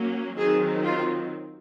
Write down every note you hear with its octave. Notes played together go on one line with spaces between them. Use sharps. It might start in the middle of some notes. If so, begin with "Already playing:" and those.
Already playing: F#3 A#3 C#4
D#3 F#3 C4 G#4
F4